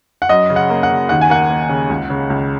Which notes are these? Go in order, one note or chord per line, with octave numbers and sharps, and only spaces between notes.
F#5
F#2 D#5
C#3
F#5
A#3
F#5
C#3
D#2 F#5
G#5
A#3 F#5
A#3
C#3
C#2
C#3
C#2